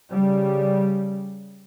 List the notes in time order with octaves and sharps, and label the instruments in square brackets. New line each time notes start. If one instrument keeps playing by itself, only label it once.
[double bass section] C#3 G3